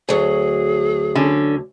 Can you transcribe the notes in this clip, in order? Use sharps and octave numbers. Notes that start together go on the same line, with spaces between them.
D2 F#3 G#4
D3 C#4